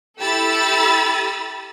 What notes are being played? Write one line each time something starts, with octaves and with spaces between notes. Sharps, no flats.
E4 G4 A4 B5 E6 A6